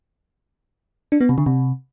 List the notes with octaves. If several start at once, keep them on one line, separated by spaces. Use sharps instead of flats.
D4
B3
C3
D3
C3